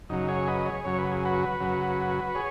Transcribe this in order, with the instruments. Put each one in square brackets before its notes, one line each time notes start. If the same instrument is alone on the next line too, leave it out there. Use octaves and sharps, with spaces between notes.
[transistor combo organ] F#2 C#3 F#3 D#4
G#4 C#5
B4 D#5
G#4 C#5
F#2 C#3 F#3 C#5
B4
G#4
F#4 B4
F#2 C#3 F#3
G#4 C#5